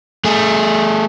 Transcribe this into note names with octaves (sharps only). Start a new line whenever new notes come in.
A3 G#4